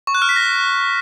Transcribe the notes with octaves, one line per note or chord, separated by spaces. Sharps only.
C#6
F#6
F6
B6
A#6